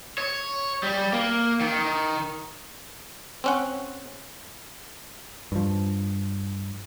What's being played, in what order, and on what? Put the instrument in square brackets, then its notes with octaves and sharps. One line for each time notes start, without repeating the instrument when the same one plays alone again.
[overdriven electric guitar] C#5
G3
A#3
D#3
[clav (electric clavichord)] C4 C#4 F#5
[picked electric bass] G2 F3